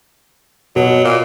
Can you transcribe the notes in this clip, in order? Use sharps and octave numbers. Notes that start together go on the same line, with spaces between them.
B2 F#3
A#2